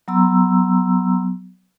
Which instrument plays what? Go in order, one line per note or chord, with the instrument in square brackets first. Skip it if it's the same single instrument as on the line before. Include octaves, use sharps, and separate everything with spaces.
[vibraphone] F#3 B3 A#5 C6 E6